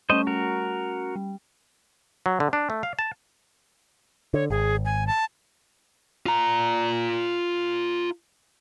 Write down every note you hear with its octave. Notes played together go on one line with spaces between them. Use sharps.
G3 A3 C#4 C5 D#5
F#4 A#4
G3
F#3
D3
D4
A3
F5
A5
D3 C#5
G#1 G#4
G#5
A5
F4 A#5